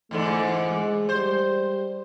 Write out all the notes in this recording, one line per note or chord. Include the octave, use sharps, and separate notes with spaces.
E2 G#2 D3 A3
G#3
G3 C5